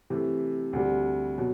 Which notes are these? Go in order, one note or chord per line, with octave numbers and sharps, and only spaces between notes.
C3 E3 A3
D2 C3 G3
B2 F#3